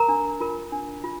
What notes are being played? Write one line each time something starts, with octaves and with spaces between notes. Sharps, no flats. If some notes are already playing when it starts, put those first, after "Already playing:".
Already playing: A#4 A#5
D4
F4 A#4
D4
F4